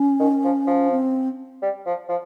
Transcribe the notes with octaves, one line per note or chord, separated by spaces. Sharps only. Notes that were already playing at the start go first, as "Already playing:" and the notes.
Already playing: C#4
D#3
F3
F3
C4
G3
F3
F3